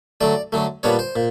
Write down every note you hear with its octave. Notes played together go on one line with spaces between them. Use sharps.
D3 F#3 A3 D5
D3 F#3 A3
A#2 G3 B3 D4 C#5
C5
A#2